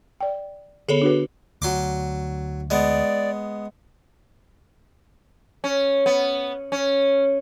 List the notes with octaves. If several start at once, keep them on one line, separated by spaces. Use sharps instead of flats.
D5 G5
D3 B3 G#4 A4 C#5
D4 F#4 B4
D2 F#3 C6 D6
G#3 B3 D5
C#4
B3
C#4